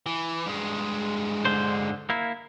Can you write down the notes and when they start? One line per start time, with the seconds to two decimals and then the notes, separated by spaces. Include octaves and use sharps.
0.06 E3
0.47 G2 G#3
1.45 D3 C5
2.10 A#3 E4